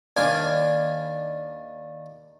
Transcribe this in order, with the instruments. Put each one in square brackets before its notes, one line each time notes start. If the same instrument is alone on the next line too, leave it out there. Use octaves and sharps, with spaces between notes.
[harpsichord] D#2 D4 F5 G#5